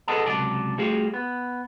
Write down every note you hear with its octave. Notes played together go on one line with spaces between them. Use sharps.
G#4 A4 B4 D#5 F#5 A5
C#2 C3 F#3 D5 A5
G3 A3 F4 F#4 G#4
B3